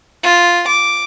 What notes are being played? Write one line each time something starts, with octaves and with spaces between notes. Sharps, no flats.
F4
D6